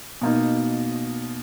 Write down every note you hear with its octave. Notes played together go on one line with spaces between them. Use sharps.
B2 A#3 D#4